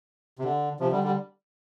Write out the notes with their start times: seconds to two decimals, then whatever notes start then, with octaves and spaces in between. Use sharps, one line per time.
0.39 C3
0.44 D3
0.80 C3 F3
0.91 D3 G3
1.03 D3 G3